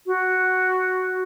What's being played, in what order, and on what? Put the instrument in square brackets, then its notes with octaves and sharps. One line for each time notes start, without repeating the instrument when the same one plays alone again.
[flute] F#4